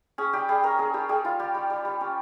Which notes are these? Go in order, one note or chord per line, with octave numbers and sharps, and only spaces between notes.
C#4 G#4
G3 G4
G3 G#4
C#4 A#4
C#4 G#4
G3 G4
G3 G#4
G3 F4
G3 G4
G3
G3
G3
C#4